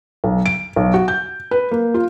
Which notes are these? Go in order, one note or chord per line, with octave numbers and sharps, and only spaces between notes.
B1
D7
B1
F#4
G6
B4
A#3
F4